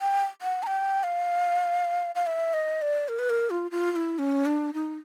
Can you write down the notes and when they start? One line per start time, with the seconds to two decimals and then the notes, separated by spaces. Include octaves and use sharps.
0.01 G5
0.42 F#5
0.63 A#5
0.67 G5
1.03 F5
2.15 F5
2.27 E5
2.54 D#5
2.82 D5
3.09 A#4
3.19 B4
3.30 A#4
3.50 F4
3.71 F4
3.92 F4
3.96 E4
4.19 C#4
4.46 D4
4.74 D#4